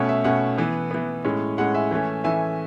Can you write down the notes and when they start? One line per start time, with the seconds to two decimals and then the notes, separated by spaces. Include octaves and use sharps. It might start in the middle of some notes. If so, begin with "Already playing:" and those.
Already playing: B2 A3 C#4 F#5
0.09 E5
0.24 B2 A3 C#4 F#5
0.58 E3 B3
0.91 E3 B3
1.25 A2 G#3 C#4
1.58 A2 G#3 C#4 F#5
1.74 E5 G#5
1.91 E3 A3 C#4
2.24 E3 A3 C#4 E5 G#5